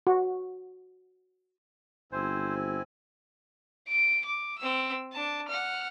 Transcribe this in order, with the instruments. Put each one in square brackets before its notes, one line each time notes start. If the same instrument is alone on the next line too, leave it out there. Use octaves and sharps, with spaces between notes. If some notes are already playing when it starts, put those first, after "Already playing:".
[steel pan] F#4
[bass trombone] G1 [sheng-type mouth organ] C4 E4 G#5 [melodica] C5
[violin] D7
D6
C4 E6
D4 A5
F#5 F6